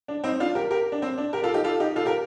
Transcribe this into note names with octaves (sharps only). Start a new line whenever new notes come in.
D4
C4 D#4
D4 F4
G4 A#4
G4 A#4
D4
C4
D4
G4 A#4
F4 A4
D#4 G4
F4 A4
D#4 G4
F4 A4
G4 A#4